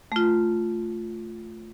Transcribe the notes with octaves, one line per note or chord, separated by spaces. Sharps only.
A3 F4